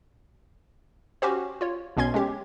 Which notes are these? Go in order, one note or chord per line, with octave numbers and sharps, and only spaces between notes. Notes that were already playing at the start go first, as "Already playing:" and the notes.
C#4 F#4 G4 C5
F4 C#5
B1 B2 B3 C#4 C6 G#6
G#3 C#4 G4